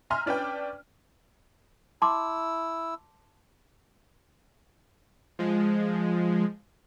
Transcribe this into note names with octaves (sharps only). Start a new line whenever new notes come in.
E5 G#5 A#5 C6 F6
C#4 D4 B4 D5 G5
E4 A5 C6 D6 E6
F3 G#3